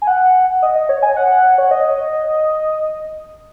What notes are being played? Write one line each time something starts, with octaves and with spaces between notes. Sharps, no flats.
G#5
F#5
D#5
D#5
C#5
G#5
F#5
C#5
D#5